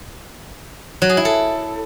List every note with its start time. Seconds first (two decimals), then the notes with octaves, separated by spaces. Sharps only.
1.02 F#3
1.09 G#4
1.17 E4
1.25 A4